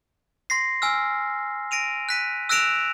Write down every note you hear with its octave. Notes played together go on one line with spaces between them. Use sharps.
C6 A#6 C7
G#5 E6 F6
A#6 D7 D#7 F7
F#6 B6 D#7
E6 F#6 A#6 D7 E7 F7